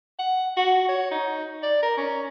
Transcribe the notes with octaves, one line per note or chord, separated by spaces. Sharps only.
F#5
F#4
C#5
D#4
D5
A#4
C#4